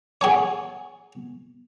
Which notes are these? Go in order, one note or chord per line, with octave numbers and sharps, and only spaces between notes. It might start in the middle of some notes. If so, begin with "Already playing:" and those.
G#4 C#5 F#5 G#5 C#6